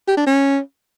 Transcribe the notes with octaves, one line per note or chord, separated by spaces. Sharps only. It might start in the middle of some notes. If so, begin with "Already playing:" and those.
G4
D4
C#4